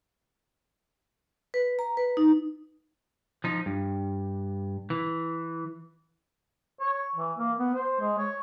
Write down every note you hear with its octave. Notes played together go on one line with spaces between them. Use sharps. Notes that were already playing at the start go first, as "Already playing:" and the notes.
B4
A#5
B4
D#4
F3 D#4
G2
E3
C#5
E3
A#3
B3
C5
G#3
C#5